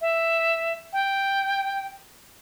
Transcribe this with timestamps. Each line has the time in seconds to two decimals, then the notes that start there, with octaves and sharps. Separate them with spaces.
0.01 E5
0.93 G5